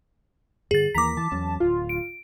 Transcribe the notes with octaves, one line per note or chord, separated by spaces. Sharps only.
G2 D3 G#4 A6
D#2 E3 A#3 A#5 D6 B6
E3 A5
E2 F#3 C#4
D1 F4
D7